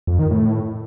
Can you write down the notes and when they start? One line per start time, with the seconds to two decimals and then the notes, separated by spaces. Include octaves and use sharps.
0.07 F2
0.19 D#3
0.31 A2